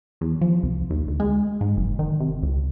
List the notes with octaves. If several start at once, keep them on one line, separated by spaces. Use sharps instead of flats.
E2
F3
C2
D#2
D2
G#3
G#2
F#1
D#3
C3
C#2